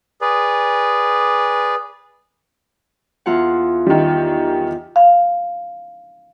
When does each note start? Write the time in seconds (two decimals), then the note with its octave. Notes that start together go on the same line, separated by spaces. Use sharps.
0.21 G#4 B4 D5
3.26 E2 F4 F#5
3.87 D#3 G3
4.96 F5